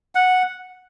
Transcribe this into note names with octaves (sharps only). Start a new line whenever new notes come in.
F#5